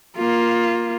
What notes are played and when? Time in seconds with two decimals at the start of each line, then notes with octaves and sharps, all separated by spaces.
0.18 A#3 F4